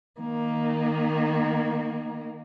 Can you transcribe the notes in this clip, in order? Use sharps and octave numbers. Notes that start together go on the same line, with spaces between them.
D#3 A#3